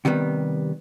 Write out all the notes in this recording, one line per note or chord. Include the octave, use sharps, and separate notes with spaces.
C3 D#3 G3 B3